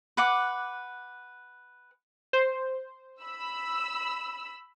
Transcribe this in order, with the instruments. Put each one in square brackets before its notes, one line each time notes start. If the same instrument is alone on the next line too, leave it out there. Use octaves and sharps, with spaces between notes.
[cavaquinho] B4 F#5 D6
[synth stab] C5
[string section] B5 E6